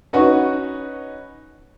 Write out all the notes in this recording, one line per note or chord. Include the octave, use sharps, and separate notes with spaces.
C#4 D#4 F#4 B4 F#5 C#6